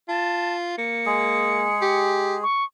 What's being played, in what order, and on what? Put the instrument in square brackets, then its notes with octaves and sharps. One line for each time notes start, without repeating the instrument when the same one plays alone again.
[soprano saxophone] F4 [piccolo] A5
[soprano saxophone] A#3 [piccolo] C#7
[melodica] G#3 G#4
[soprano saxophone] G4
[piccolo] C#6